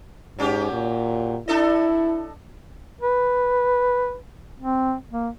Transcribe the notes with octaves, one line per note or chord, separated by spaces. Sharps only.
G#2 F#3 C#4 G4
A#2
D4 E4 A4 D#5
B4
C4
A#3